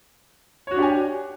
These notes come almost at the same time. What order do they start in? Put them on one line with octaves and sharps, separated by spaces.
C#5 F#4 D4 G4 G#5